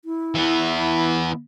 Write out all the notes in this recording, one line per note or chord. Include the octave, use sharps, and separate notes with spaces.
E4
E3 B3